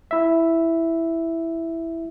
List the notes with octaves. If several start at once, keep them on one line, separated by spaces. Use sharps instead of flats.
E4 E5